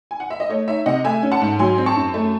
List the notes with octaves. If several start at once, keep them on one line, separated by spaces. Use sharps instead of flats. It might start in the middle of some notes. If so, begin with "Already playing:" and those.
G#5
F#5
E5
D#5
A3 C#5
D#4 C#5 E5
C3 D#5 F#5
A3 E5 G#5
C#4
F#5 A5
G#2
F#3 G#5 C6
C4
A5 C#6
F#2
A3